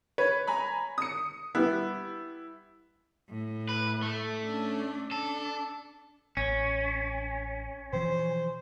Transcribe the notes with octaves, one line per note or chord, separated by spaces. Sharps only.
B4 C#5
G#5 A#5 B5
D#6 C#7
G3 B3 E4
A2
B4
A3
C#4 D4
D4 A4
A1 C#4
B2 E3 F3 C5